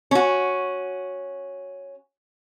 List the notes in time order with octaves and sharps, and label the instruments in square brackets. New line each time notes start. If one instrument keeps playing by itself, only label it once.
[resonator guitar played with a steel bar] C#4 F#4